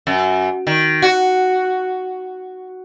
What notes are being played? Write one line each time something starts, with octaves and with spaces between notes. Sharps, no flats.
F#2
D#3
F#4